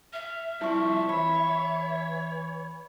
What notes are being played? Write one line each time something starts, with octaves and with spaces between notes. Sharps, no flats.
E5 F6
C3 F3 G3 E4 C#6
E3 C#5 B5